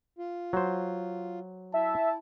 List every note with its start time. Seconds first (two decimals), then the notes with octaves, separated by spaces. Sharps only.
0.18 F4
0.53 F#3 C5
1.74 E4 E5 A5